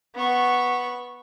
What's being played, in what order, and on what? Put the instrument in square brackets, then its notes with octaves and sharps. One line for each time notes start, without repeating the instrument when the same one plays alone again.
[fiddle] B3 C#6